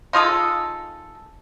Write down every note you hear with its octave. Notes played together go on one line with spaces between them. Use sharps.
D#4 F4 G#4 A4